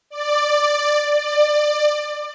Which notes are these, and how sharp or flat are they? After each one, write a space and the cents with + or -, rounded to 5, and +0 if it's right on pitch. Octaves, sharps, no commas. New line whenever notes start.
D5 +10
D5 +25